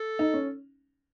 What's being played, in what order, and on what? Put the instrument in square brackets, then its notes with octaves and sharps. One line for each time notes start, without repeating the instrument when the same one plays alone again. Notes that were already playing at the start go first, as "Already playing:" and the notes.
Already playing: [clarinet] A4
[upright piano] D#4
C#4